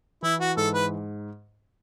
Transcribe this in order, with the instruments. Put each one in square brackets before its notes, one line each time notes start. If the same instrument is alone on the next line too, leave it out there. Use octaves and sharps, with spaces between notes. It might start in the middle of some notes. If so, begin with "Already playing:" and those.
[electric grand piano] E3 [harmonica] E4
[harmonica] F#4
[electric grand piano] G#2 [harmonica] A4
[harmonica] B4